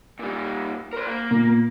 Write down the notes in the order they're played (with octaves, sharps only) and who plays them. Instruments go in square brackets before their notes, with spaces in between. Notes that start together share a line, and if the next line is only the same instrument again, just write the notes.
[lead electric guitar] A#2 G3
A#4 C5
A#3
[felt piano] A#2